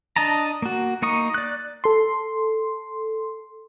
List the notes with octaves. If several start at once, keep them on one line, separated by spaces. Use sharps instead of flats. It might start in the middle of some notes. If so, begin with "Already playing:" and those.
D4 D#5 A5 A#5
A#3 F#4
A#3 D#4 C#6 D#6
D5 F#6
A4 C6